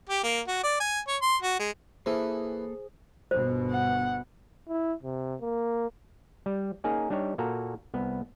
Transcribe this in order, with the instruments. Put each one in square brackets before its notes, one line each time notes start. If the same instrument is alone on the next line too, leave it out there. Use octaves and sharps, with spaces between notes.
[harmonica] G4
A#3
F#4
D5
G#5
C#5
C6
F#4
G#3
[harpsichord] E3 [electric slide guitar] A#3 A4 [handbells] G#4 [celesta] C5
[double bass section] G1 B2 [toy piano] C5
[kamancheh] F#5
[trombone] E4
C3
A#3
[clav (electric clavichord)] G3
A#3 C#4 D#4 G#4 A#4
G3 D4 D#4 G4 C#5
A#2 A#3 F#4 A4 A#5
C2 B3